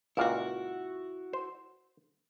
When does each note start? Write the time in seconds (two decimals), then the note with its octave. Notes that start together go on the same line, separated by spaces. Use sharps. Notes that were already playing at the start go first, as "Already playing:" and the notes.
0.17 C#2 A#2 E4 F#4 F5
1.33 C5